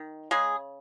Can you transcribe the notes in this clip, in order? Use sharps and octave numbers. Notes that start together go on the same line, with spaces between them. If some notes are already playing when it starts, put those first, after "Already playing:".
Already playing: D#3
C#3 G#3 G#4